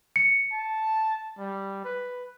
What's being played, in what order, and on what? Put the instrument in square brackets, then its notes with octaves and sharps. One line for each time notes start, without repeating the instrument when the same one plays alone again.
[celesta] C#7
[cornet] A5
G3
B4